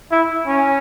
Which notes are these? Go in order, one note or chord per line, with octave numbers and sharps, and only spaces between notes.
E4
C#4